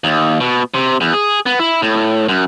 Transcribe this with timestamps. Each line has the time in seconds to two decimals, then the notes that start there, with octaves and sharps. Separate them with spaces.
0.04 D#2
0.41 B2
0.74 C3
1.01 E2
1.13 G#4
1.46 B3
1.60 E4
1.82 A2
2.29 F#2